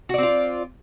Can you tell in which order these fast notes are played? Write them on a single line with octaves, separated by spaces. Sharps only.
F#4 D5 C4 F4